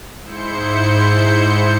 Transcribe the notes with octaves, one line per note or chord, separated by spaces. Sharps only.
G#2 E4 C5 G6 C#7